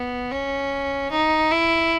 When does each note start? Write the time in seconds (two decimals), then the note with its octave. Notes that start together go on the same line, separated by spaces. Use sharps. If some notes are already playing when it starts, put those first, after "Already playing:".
Already playing: B3
0.31 C#4
1.11 D#4
1.51 E4